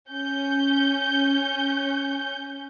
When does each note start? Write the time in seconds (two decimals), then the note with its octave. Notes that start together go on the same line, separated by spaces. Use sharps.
0.11 C#4 G6